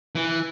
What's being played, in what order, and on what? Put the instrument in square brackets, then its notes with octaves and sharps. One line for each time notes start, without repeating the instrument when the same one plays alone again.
[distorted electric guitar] E3